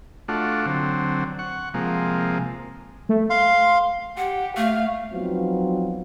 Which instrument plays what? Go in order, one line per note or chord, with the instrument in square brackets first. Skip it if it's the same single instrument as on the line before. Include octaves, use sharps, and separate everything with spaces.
[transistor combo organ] A3 D4 F4 F#4
D3 F#3 C4
F#5 C#6
C3 F3 G#3 A#3
[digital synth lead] A3
[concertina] F5 [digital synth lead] C6
[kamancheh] G4 [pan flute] F#5
[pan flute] A3 [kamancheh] F5
[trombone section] F3 F#3 B3 C4 D#4 F4